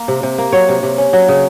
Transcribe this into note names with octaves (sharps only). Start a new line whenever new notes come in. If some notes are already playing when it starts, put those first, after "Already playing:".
Already playing: A#3
C3
C3
A#3
F#3 C#5
C3
C3
C#4
F#3
C#3